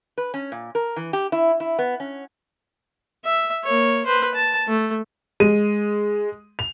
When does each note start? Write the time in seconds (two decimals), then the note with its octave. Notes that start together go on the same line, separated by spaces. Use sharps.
0.18 B4
0.34 C#4
0.52 A#2
0.75 A#4
0.96 E3
1.13 G4
1.32 E4
1.60 E4
1.79 B3
2.00 C#4
3.24 E5
3.64 A#3 C#5
4.06 B4 C5
4.34 A5
4.67 A3
5.40 G#3 D#7
6.59 F7